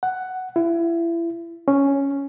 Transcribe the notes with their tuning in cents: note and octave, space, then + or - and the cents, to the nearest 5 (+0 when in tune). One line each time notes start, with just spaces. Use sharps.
F#5 +5
E4 +30
C#4 +0